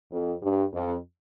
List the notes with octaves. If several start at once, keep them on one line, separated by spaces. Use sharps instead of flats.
F2
G2
F2